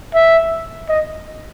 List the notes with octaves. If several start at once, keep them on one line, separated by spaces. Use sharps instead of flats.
E5
D#5